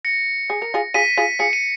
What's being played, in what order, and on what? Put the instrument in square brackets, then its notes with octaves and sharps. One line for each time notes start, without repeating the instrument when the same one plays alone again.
[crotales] A#6 C#7
[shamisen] G#4
A#4
F4 G#4
[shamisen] F4 G#4 [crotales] B6 D#7
[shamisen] F4 G#4
[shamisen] F4 G#4 [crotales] C#7
[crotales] D#7